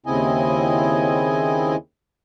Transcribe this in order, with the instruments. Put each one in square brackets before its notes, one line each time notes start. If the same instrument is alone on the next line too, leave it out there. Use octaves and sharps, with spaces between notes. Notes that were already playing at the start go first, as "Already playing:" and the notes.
[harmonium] D#2 C#3 C4 E4 D#5 G#5